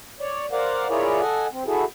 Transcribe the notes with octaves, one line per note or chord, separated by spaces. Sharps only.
C#5 D5
A#4 C5 D5 F5 F#5
E4 F4 G#4 A#4 C#5 D5
A4 D#5 F#5 G#5
C4
E4 F#4 G#4 A4